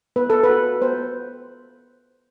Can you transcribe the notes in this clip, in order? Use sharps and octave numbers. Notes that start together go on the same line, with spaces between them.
B3 B4
A4
B4
F#4
B3 C5